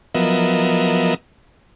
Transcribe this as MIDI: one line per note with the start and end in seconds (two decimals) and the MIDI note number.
0.15 1.14 53
0.15 1.14 54
0.15 1.14 59
0.15 1.14 70
0.15 1.14 75
0.15 1.14 76